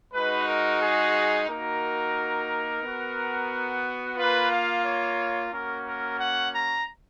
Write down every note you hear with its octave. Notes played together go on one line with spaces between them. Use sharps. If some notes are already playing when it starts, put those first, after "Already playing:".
G#3 D#4 F#4 B4
A#4
G#4
A#3 D#4 F#4 A#4
B3 F#4
A#3 F4 B4
F5
C#5
A#3 C#4 F#4 A#4
A#4
F#5
A#5